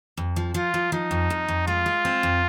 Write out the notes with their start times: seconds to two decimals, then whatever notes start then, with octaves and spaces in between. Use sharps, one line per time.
0.17 F2
0.36 F3
0.54 F3 F4
0.74 F3
0.92 F3 D#4
1.11 F2
1.30 F2
1.48 F2
1.67 G#3 F4
1.86 G#3
2.05 C4
2.23 F2